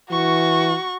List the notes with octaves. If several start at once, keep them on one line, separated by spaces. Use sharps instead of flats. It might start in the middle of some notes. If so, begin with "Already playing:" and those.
E3 F#4 C#6